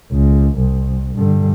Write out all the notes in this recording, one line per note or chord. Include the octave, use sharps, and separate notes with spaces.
C#2
C2
G2 D3